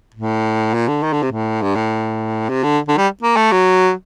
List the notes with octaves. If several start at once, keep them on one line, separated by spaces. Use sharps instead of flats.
A2
A#2
D3
D#3
D3
C3
A2
G2
A2
C3
D3
D3
G3
A#3
A3
F#3